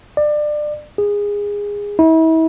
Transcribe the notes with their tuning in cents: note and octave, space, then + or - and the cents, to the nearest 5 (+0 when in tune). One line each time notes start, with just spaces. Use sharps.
D5 +25
G#4 -20
E4 -40